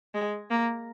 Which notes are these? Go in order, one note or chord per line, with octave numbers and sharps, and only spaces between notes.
G#3
A#3